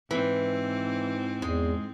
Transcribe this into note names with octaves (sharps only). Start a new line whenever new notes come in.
G#2 E3 C4
E2 G#3